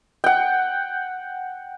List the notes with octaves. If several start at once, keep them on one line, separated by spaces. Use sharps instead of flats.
F#5 G5